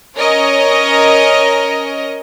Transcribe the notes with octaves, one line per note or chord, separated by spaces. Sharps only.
C#4 A#4 C#5 D#5